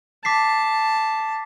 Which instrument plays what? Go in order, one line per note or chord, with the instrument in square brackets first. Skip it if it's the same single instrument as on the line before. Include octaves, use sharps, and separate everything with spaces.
[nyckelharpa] A5 [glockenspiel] D6 B6 C7